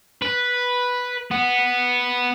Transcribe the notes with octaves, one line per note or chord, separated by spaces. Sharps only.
B4
B3